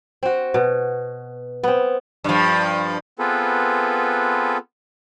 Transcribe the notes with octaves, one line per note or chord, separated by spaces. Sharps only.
C4 F#4
B2
B3 C4
G2 F3
B3 C4 F4 G#4 A4 B4